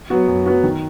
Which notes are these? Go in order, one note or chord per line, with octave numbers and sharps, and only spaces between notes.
F#3 B3 F#4
F#2
F#3 B3 F#4
D#3